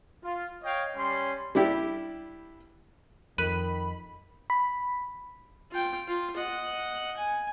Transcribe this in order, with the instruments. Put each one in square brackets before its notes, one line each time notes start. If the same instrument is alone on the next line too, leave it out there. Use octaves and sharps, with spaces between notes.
[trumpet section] F4
C#5 D#5 F5 G5
G3 C#4 C6
[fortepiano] G3 D4 E4 G4
[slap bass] F2 [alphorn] D#3 [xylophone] A#4 F#6 D#7 [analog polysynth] B5
[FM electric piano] B5
[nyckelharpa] F4 G5
F4
D#5 F#5
G#5